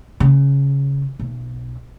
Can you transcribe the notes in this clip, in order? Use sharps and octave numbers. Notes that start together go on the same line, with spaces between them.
C#3
B1